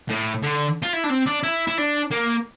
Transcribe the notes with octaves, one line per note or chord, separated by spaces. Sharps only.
A2
D3
F4
E4
D4
C4
D4
E4
E4
D4
A#3